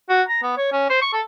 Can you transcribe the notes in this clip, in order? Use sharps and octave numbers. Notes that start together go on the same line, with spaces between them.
F#4
A#5
B3
C#5
C#4
C5
C#6
A4